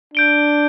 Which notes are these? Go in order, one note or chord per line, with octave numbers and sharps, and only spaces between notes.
D4 G6 D7 G7